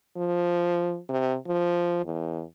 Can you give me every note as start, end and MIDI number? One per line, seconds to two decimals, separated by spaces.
0.17 0.99 53
1.09 1.36 48
1.48 2.00 53
2.05 2.43 40